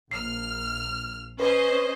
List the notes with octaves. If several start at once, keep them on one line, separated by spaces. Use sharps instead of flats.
A#1 F6 C7
C#4 B4 C5 D#5